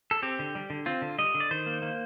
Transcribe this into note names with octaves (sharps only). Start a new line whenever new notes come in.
A4
C4 G4
D3
G3
D3
C4 F4
D3
G3 D#5
D3
D5
D#3 C5
A#3
A#3